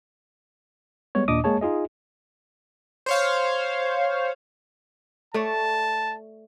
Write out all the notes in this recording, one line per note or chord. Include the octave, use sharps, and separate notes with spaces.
G3 G#3 B3 C#5
D#2 A#2 D4 D#5 D6 D#6
G#3 A#3 G#4 C#5 A5
D#4 F4 G#4 D#5
C5 C#5 F5
A3 C#5 D5 A5